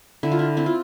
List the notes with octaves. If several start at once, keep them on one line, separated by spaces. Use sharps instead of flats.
D3 E4
F4
E4
C4 E4
F4